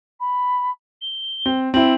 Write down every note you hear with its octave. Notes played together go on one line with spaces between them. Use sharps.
B5
G7
C4
C4 E4 F#7